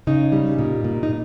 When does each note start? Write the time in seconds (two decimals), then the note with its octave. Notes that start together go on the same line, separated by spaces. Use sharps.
0.07 C#3 D#4
0.32 G3
0.59 A#2
0.84 A#2
1.03 D#4